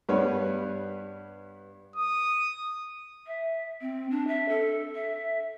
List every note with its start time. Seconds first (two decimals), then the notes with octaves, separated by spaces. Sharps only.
0.09 G2 G3 B3 B4 C#5
1.96 D#6
3.27 E5
3.81 C4
4.11 D4
4.27 E5
4.49 A4
4.95 E5